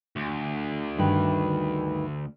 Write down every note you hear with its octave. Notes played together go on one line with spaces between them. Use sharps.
D2
G2 D#3 B4